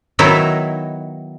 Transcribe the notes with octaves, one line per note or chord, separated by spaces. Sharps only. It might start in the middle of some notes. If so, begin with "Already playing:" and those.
D#3 F#3 B3 D#4 E4